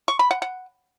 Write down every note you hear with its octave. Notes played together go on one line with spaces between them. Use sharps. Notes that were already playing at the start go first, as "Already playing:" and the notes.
C#6
B5
F#5
F#5